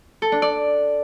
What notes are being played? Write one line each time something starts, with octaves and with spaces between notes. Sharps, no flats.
A4
D4
D5